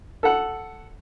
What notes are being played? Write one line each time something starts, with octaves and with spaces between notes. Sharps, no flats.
A4 F#5